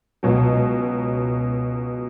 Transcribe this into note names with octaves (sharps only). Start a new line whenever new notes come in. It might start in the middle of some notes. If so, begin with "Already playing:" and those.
C#2 B2 F#3